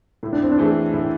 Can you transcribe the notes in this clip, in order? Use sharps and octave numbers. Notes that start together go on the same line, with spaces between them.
A2 E4
D4
C4
D4
E3 A3 C4 G#4
A2 E4